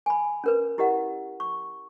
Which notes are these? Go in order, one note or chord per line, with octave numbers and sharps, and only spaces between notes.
G#5 B5
C#4 A#4 B4
E4 G4 A#4 D#5 F#5
C#6